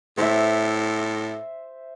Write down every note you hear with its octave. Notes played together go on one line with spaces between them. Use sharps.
A2 C5 E5